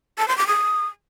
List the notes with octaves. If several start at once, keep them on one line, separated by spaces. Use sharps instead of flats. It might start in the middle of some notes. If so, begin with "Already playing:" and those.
A5
C6
D6
D#6